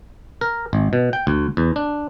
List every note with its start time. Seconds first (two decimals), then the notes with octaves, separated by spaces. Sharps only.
0.41 A#4
0.73 G#1
0.93 B2
1.13 G5
1.27 D2
1.57 E2
1.76 D4